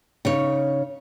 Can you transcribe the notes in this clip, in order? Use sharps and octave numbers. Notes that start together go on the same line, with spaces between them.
C#3 D#4 C#5